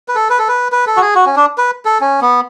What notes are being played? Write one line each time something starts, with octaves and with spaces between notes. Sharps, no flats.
B4
A4
B4
A4
B4
B4
A4
F#4
G#4
F#4
C#4
D4
B4
A4
C#4
B3